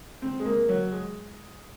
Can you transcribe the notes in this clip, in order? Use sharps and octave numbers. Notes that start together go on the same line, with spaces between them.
C4
G#3
A#3
F#3
G#3